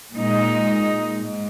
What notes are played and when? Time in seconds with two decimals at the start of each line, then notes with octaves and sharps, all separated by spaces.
0.12 A#2 G#3 D#4
1.19 G#2